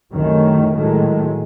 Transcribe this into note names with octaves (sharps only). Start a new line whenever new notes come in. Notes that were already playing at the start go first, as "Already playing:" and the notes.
C2 F#2 D#3 A3 C#4
A2 D#3 F#3 G#3 A3